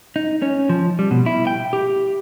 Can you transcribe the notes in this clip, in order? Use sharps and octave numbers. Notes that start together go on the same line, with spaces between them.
D#4
C#4
F3
G3
B2
E4
G5
G4